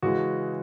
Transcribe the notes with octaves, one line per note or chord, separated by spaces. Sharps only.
C#3 E3 G#3 F#4